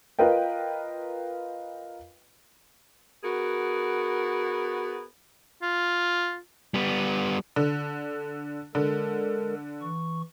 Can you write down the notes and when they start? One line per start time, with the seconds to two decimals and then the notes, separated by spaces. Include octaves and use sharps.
0.19 F4 A#4 B4 D#5 G5
3.23 B3 F#4 G#4 A#4
5.62 F4
6.74 G3 B3
7.56 D3
8.75 D3 G#3 A4 A#4
9.82 E3 C#6